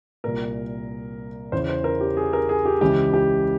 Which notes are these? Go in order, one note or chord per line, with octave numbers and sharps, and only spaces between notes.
C2 A#2 A#4
E2 C#3 E3 C5
C5
A#4
G4
G#4
A#4
G#4
G4
C#2 C#3 E3 G4
G4